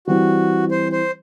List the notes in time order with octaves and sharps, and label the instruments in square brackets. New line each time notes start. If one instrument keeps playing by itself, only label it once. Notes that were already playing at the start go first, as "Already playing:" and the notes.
[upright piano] E3 G3 C4 [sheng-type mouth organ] F#4
[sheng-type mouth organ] C5
C5